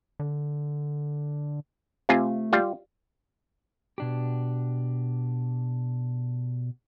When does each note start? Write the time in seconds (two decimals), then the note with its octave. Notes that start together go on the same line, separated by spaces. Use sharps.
0.20 D3
2.09 C3 A3 F4 G#5
2.53 G3 F4
3.98 B2 D4 G4